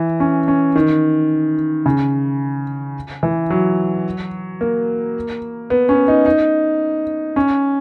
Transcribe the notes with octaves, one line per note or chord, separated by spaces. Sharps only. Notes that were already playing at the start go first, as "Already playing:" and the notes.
Already playing: E3
C#4
C#4
D#3
C#3
E3
F#3
A#3
B3
C#4
D#4
D#4
C#4